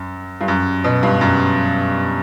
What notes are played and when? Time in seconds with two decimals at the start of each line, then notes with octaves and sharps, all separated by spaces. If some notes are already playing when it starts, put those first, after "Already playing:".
Already playing: F#2
0.41 G2
0.48 F#2
0.84 B2
1.03 G2
1.21 F#2